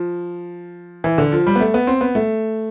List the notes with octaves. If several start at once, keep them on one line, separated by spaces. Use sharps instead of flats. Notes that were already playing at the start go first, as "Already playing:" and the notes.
Already playing: F3
E3
D3
F3
G3
B3
A3
B3
C4
B3
A3